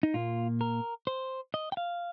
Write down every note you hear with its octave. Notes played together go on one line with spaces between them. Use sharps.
D#4
A#2 A#3 F4
A#4
C5
D#5
G5
F5